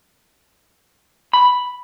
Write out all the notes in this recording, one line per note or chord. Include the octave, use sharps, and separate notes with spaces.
B5